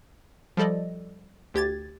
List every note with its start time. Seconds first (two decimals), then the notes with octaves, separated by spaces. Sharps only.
0.57 F3 G3 A4 D5 D#5
1.54 D2 G4 G#6 A6